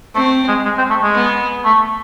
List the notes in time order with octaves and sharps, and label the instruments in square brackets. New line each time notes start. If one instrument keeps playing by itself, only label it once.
[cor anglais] A3 [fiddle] C4
[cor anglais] G#3
G#3
C4
A3
G#3
[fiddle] B3
[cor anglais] A3